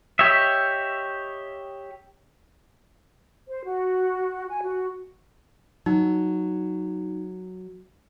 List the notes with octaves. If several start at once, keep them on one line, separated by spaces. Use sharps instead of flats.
G4 C#5 D#5 E5
C5
F#4
G#5
F#4
F#3 D#4